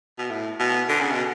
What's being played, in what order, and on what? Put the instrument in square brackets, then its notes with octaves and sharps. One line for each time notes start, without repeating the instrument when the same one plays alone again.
[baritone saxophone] B2
A2
B2
D3
C#3
B2